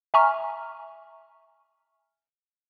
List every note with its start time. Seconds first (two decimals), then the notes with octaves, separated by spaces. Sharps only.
0.14 E5 G#5 A#5 C#6 F6